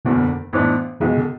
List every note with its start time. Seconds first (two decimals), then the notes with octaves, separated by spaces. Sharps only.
0.05 F#1 E2 B2 D3
0.53 A1 G#2 E3 B3 D4
1.00 C#2 B2 E3 G#3
1.17 D3